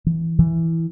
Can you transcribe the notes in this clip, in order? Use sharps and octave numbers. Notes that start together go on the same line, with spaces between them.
E3
E3